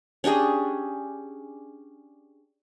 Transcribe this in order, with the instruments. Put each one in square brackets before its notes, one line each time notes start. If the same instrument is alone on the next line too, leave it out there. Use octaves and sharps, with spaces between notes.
[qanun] C#4 D4 G4 G#4